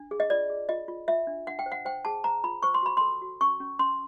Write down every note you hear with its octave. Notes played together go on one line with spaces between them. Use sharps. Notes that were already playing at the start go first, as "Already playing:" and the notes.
Already playing: D4
G#4
D#5
F4 D5
G#4
F4 D#5
F4
F4 E5
D4
D4 F#5
G5
C5
F#5
C5 G5
G#4 A5
C5 A#5
F4 B5
C5 C#6
C6
F#4 B5
A4 C6
F#4
C#4 C#6
C#4
C#4 C6